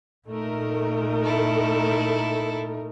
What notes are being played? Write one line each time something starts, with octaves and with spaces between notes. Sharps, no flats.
A#2 A3 D#4 A#4
E4 A4